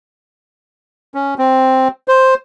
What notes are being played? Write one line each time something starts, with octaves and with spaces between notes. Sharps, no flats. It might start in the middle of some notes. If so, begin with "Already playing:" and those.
C#4
C4
C5